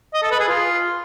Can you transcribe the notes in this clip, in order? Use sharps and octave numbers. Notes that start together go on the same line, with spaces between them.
D#5
A4
B4
G#4
F4